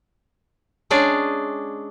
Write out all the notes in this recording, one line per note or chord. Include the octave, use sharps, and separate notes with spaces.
G#3 C#4 D4 G#4 D5